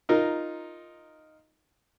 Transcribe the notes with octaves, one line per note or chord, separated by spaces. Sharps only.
D#4 F4 A#4